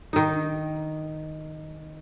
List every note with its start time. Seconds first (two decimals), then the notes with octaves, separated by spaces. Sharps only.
0.13 D#3 D#4